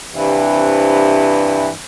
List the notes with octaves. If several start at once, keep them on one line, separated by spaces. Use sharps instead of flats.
G2 C3 E3